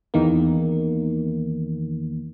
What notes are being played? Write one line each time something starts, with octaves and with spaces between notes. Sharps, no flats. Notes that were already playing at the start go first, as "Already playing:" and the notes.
E2 D#3 A#3